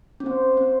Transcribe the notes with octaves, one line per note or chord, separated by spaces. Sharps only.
C#4
C4 C5
C4